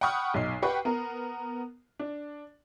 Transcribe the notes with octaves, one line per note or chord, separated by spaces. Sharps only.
F#5 G5 B5 C#6 D#6 F6
B1 D#4 C7
G4 B4 F#5 G5 C#6
B3 A#4
D4